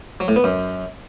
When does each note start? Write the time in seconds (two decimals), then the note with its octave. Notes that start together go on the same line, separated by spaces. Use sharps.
0.20 F#3
0.28 A2
0.36 B3
0.44 F#2